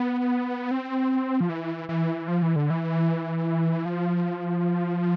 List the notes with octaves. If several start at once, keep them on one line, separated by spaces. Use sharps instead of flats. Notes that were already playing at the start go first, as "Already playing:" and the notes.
Already playing: B3
C4
F3
E3
E3
F3
E3
D3
E3
F3